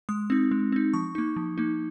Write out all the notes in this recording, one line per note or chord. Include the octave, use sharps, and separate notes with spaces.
G#3 D#6
C4 D#4
G#3
C4 D#4
F3 C#6
A#3 D#4
F3
A#3 D#4